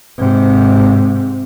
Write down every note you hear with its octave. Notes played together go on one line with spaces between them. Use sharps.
G#2 C3